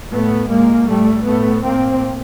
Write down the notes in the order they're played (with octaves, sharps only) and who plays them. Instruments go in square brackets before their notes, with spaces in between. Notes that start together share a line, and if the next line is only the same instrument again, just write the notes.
[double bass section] A2 A3 B3
A#2 G#3 A#3
A2 G3 A3
A2 A3 B3
A2 A#3 C4